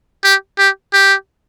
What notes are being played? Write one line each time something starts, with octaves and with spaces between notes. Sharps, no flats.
G4
G4
G4